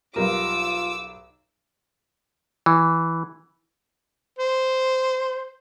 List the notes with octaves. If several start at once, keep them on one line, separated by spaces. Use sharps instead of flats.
B1 G3 F4 A#4 D6 E6
E3
C5